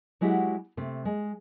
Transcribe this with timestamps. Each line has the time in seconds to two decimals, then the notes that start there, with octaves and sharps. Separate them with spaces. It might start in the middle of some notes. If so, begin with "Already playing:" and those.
0.21 F#3 G#3 E4 F#4 G4 F#5
0.77 C3 A3
1.05 G#3